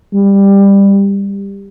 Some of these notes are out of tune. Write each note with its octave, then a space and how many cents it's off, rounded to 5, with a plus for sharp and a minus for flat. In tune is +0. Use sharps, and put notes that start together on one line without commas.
G3 +15